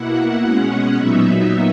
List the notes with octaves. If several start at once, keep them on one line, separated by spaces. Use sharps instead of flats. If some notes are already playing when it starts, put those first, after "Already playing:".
Already playing: B2 A#3 E4 F#5
B2 G#3 C#4 F#5
A#2 F#3 B3 D#4 E5